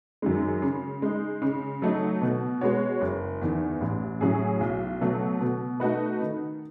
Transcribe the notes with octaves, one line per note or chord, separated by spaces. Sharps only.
F#2 D#3 G#3
C#3
G#3 D#4
C#3
F#3 A3 D#4
B2
G#3 B3 F#4 C#5
F#1
E2 D#3
A1
A2 F#3 C#4 G#4
B1
B2 F#3 A3
B2
A3 D#4 F#4 B4
D#3